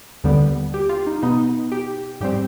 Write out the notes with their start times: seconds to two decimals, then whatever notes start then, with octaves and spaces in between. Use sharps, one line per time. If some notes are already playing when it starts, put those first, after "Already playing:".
0.24 D#2 D3 G3 B3
0.74 G4
0.89 F4
1.07 D#4
1.23 B2 B3 D#4
1.72 G4
2.21 G#2 G3 C4 G4